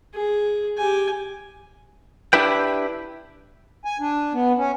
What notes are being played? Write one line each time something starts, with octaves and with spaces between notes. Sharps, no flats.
G#4
G4 G#5
D4 E4 G4 B4 G5
G#5
D4
B3
C#4